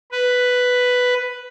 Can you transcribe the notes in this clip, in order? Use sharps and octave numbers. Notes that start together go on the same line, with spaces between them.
B4